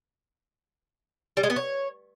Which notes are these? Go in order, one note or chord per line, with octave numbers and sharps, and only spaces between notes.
G3
G#3
B3
C#5